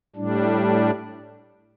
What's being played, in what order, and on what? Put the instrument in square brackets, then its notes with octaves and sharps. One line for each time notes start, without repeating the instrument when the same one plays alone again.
[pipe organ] A2 G3 D4